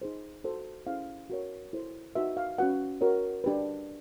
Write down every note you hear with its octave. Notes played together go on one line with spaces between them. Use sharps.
D#4 G#4 C5
F#4 A4 C5
C#4 E4 G#4 C5 F5
F#4 A#4 C#5
E4 A4 C5
D#4 F#4 B4 E5
F5
C#4 F#4 B4 F#5
F#4 A#4 C#5
D4 G4 B4